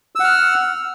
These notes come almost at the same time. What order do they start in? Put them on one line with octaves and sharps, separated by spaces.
E6 F#5 F6